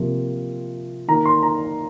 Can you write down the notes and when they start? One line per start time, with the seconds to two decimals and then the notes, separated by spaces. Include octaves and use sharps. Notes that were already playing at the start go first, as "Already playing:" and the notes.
Already playing: C3 F3 A#3
1.08 D#3 A#3 A#5
1.25 C6
1.43 A#5